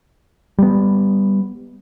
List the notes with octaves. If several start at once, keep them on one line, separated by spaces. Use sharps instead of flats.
G3 B3